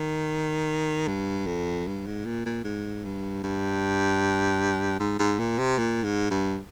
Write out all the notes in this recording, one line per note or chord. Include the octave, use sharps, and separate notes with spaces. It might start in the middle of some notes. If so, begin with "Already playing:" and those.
Already playing: D#3
G2
F2
G2
G#2
A#2
A#2
G#2
G2
G2
G#2
G#2
A#2
C3
A#2
G#2
G2